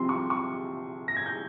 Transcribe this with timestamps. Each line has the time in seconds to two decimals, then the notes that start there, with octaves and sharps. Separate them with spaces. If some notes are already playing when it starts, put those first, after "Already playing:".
Already playing: C2 C3 F3 C4 C6
0.09 C#6
0.30 C#6
1.08 A#6
1.17 G#6
1.26 G6